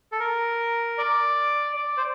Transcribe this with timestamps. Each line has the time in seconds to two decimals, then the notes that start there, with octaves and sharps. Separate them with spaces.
0.12 A4
0.20 A#4
0.98 D5
1.76 D5
1.97 C5